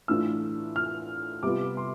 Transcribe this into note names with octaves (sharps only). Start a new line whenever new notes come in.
A2 E3 A3 D4 F4 E6
F6
C3 G3 B3 F4 D6
C6